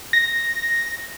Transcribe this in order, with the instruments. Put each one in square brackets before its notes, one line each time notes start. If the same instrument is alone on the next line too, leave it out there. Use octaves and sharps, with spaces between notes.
[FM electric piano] A#6